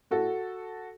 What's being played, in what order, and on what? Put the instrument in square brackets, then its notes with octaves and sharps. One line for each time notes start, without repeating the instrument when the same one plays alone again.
[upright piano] A2 F#4 A4